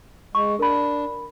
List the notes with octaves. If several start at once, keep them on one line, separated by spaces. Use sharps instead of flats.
G#3 C#6
D4 A#4 B5